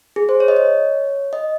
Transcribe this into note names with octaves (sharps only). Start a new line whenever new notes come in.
G#4
C5
C#5
D#5
C#5
D#5